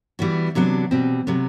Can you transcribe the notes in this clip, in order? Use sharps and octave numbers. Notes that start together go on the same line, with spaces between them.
E3 G3 B3 F#4
C3 F#3 B3 D4
B2 G3 C4
C3 F#3 B3